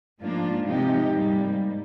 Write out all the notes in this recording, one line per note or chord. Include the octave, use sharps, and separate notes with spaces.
G#2 F3 A#3 D4 F4
C3 F3 G#3 D#4 G4
G#2 G3 A#3